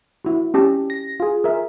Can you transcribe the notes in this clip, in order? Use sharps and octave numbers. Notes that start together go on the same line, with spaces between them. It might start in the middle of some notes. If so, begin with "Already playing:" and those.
E4 F#4
C#4 G4 A5
A#6
F4 G#4
A#4 E5